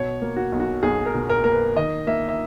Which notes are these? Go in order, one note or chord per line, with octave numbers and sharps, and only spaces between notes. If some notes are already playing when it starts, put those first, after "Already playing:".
Already playing: B2 C#5
A#3
F#4
B1
F#4
B1 G#4
A#4
B2
A#4
A#3 A#4
B4
D#3 D#5
A#3 E5
E5